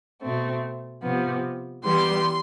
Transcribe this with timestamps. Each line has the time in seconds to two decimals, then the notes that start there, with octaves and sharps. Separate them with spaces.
0.22 B2 A3 C4
1.03 C3 F3 B3
1.84 E3 G3 B3 C6